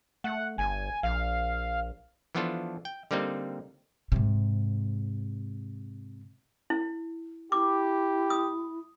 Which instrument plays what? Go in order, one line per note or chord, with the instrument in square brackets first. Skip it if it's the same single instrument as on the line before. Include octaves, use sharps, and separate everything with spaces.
[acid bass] A3 [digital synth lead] F#5
[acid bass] G1 [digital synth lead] G#5
[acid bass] A#1 [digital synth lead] F5
[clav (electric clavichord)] E3 F3 B3 D4 F4 A4
G5
D3 G3 A#3 C4 D#4
[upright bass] G#2 C3
[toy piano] E4
[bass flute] E4 [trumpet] G4 [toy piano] D6
[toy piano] D#6